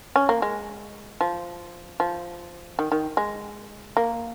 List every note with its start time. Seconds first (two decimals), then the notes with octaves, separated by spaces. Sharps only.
0.16 C#4
0.29 A#3
0.42 G#3
1.21 F3
2.00 F3
2.79 D#3
2.92 D#3
3.17 G#3
3.97 A#3